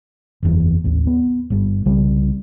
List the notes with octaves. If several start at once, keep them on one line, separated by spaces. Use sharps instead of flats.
F#1 E2
A1 D#2
B3
G1 G2
C2 C#3 G3